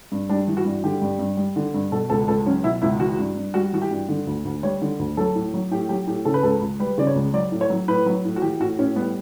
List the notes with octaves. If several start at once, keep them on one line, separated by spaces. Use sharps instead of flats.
G2
G3 D4
E3
F#4
G2
D3 G4
G2
G2
G3
D3
G2
B2 A4
C#2 A4
C#2 A4
F#3 C#4
B2 E4
C#2 E4
E3 F#4
G2
G2
G3 F#4
E3 F#4
G4
G2
D3
D2
D2
G3 C#5
D3
D2
F#3 A4
A2
F#3
A2 G4
F#3 G4
A2 G4
C#3 A4
B4
C#2 A4
C#2
G3 B4
C#3 D5
C#5
C#2
F#3 D5
A2
C#5
F#3
A2 B4
F#3
A2
F#4
E3 G4
A2 F#4
A2 C#4
G3 B3